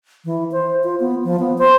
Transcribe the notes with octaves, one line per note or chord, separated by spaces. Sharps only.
E3
C5
F4
B3
F3
B3
C5